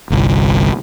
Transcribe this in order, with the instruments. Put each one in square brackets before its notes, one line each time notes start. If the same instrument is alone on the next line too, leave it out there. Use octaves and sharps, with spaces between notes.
[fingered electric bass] G1 C2